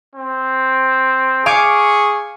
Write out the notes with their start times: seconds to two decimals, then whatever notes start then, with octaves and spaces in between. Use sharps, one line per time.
0.15 C4
1.46 G#4 F5 G#5 C#6 D6